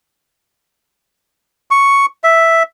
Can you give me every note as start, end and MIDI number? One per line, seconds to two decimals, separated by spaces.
1.71 2.06 85
2.24 2.63 76